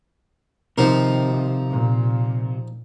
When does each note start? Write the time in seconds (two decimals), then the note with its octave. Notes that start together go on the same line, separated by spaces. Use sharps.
0.78 C3 D#3 F3 D#4 A#4
1.70 A#2